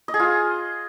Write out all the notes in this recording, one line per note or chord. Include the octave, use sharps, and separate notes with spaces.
D#5
G#4
F4